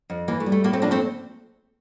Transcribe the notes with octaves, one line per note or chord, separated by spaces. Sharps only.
F2
E3 A#3
A3
G3
A3
A2 A#3
A3 C4
F3 A#3 D4
A3 C4